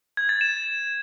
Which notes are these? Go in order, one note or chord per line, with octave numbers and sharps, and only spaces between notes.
G#6
A6
E7